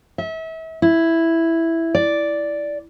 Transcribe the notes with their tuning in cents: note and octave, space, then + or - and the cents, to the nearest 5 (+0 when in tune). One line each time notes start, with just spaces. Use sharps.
E5 -35
E4 +0
D5 -5